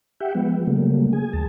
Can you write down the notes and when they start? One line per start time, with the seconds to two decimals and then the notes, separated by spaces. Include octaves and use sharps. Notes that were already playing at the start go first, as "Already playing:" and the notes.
0.20 G4 E5 F#5 G5
0.35 F3 G#3 B3
0.67 C#3 F#3 G3 A3 A#3
1.13 G#4 G#5
1.33 D#2 A5